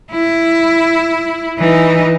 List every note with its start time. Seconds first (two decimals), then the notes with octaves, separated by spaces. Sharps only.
0.11 E4
1.58 E3 D#4